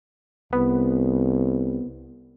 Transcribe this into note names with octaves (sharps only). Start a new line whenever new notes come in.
C2 B3